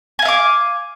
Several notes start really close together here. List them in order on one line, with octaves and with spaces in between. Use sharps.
G#5 F5 E5 D6